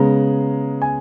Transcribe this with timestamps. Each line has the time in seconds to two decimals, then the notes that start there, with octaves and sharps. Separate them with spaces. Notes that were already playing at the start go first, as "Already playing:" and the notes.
Already playing: C#3 G#3 B3 A#5
0.82 G#5